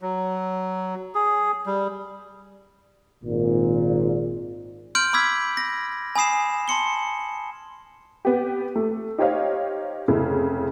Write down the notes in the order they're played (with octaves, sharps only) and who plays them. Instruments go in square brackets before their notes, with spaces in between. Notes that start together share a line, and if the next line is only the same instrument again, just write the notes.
[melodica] F#3
G#4
G3
[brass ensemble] G#1 A#2
[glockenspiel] C6 F6 G6 D7 F#7
B5 D6 E6 G#6 B6
A#6
G#5 B5 D#6 C7 E7
A5 C6 C#7 G7
[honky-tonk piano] B3 G4
A3
D#4 G4 C5 C#5 D#5 F5
F1 C#3 E4